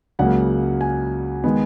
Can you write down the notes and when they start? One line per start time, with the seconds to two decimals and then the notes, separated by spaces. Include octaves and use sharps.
0.19 C#2 C#3 F#3 A#3 F#5
0.81 G#5
1.44 D#3 G#3 B3